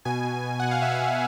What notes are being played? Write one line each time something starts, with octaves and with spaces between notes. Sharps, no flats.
B2 G#5
B2
B2
B2 F#5
F5
B2 E5
B2